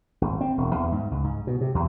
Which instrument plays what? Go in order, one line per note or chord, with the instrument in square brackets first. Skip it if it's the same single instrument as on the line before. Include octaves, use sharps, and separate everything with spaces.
[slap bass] G#1
C4
E1
E2
G#2
C#2
G#2
B2
C3
E2